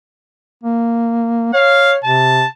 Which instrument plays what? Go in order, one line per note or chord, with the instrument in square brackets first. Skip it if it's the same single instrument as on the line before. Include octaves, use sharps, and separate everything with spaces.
[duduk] A#3
[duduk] C#5 [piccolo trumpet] F5
[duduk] C3 [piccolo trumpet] A5